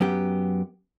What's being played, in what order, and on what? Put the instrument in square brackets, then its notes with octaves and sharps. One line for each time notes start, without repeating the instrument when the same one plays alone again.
[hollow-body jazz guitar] F#2 B3 G4